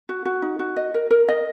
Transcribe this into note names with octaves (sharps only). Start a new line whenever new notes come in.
F#4
F#4
D#4
F#4
D#5
A#4
A#4
D#5